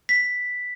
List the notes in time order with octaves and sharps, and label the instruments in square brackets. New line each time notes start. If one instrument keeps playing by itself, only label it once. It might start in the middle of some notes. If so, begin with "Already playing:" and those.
[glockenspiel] B6